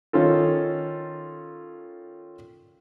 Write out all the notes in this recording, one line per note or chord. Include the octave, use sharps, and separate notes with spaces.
D#3 C#4 F4 A4